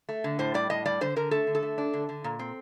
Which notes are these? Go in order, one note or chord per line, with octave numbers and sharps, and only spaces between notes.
A3
D3
A2 C5
G3 D5
A2 D#5
G3 D5
D3 C5
D3 A#4
A3 A4
D3
A4
A3
D4
D3
D3
A#2
C4